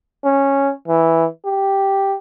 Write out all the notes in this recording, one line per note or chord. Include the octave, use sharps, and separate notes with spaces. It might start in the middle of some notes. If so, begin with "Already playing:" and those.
C#4
E3
G4